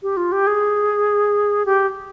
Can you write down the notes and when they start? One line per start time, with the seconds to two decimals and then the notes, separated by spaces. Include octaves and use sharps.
0.03 G4
0.17 F4
0.32 G4
0.47 G#4
1.66 G4